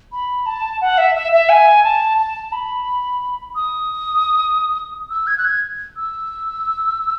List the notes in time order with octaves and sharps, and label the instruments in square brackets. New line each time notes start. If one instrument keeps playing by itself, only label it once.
[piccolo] B5
A5
F#5
E5
E5
E5
G#5
A5
A5
B5
D#6
E6
G#6
F#6
G#6
E6